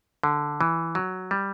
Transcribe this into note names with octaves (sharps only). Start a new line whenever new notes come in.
D3
E3
F#3
G3